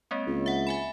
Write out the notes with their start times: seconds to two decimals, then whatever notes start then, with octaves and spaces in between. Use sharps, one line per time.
0.11 G#3 A#3 C4
0.27 C#2
0.46 E5 F#5
0.67 E5 G#5 B5